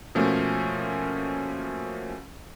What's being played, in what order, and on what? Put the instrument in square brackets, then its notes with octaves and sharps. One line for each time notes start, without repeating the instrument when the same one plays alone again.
[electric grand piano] B2 F3 A3 A#3 C#4